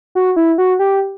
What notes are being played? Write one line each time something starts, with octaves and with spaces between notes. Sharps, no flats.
F#4
E4
F#4
G4